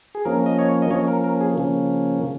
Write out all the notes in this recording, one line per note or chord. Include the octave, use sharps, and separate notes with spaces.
G#4
F3 A#3 C#4 A#4
D#5
C#5
D#5
F3 A#3 C#4 C#5
A#4
A#4
G#4
C#3 F3 A#3 C#4
C#3